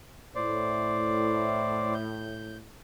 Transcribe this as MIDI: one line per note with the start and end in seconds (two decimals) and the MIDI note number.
0.35 2.67 45
0.35 1.94 72
0.35 1.94 74
1.94 2.57 91